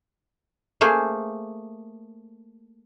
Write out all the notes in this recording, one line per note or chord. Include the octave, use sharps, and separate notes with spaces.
A3 A#3 G#4 C5